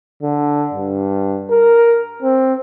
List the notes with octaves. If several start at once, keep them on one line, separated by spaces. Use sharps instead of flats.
D3
G2
A#4
C4